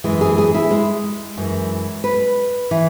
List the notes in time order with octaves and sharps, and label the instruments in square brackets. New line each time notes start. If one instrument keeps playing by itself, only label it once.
[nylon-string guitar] F#2 E3 G#3
G#4
G#4
E4
G#3
F#2 E3
B4
E3